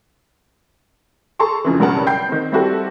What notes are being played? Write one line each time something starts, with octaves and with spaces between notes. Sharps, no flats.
G#4 A4 A5 A#5 C6 C#6
F2 C#3 E3
B1 G2 C#3 A#4 F#5 A5
G5 B5 G6 C7
D#3 C4
G3 C4 E4 F#4 G4 A4